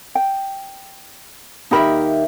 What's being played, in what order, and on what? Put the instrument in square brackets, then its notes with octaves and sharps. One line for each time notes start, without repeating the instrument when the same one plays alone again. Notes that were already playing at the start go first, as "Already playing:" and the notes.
[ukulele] G5
[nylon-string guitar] D#2 A#4 E5 [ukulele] D#4 G4 B5